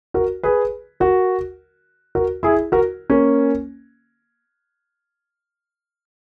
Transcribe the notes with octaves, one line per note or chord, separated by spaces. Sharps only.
F#4 A#4
G#4 B4
F#4 A#4
F#4 A#4
E4 G#4
F#4 A#4
A#3 C#4